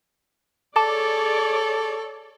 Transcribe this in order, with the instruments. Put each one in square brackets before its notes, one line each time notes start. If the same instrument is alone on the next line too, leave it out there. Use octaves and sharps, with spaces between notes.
[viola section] G#4 C#5 D5 [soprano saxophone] A4 [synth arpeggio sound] A5 D6